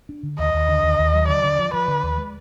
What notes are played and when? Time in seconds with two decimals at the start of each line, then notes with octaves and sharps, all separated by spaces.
0.09 D4
0.23 D3
0.38 D#2 D#5
0.54 D#2
0.68 D3
0.83 D#2
0.99 D#2
1.13 F#3
1.28 D3 D5
1.44 D3
1.59 F3
1.73 F3 B4
1.88 D3
2.03 D#2
2.18 G#3